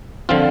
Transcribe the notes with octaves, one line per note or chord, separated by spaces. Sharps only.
D3 F3 C4 F4